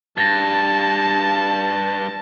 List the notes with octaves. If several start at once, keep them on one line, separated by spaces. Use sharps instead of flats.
G2 A5 A6 A#6